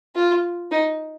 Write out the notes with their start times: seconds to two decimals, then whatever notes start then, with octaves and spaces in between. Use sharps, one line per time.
0.15 F4
0.71 D#4